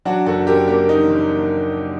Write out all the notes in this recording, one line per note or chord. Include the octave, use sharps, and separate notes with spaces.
F#3 D4 F#4
F#1 F#4 A4
F#2 G4 A#4
A#3 G4 A#4
F#3 D#4
F#1